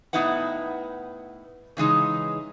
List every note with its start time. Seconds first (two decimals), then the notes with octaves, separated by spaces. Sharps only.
0.13 A2 B3 D#4 E4 B4 F#5
1.77 C#3 E3 G#3 D#4